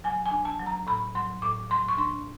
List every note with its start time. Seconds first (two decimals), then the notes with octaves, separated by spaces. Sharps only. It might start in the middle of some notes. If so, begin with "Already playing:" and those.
0.04 F#3 G#5
0.26 G#5
0.31 D4
0.45 A5
0.59 F#3
0.66 A#5
0.87 A2 B5
1.15 F#3 C6
1.42 A2 D6
1.70 F#3 C6
1.88 C#6
1.97 D4 C6